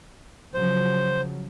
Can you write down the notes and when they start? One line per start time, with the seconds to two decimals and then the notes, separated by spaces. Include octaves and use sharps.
0.54 C#3 F3 F#3 C5